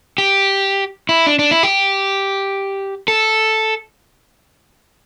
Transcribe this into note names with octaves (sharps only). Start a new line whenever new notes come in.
G4
E4
D4
D4
E4
G4
A4